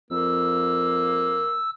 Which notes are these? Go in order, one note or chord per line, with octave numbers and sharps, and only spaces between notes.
F2 A#3 E6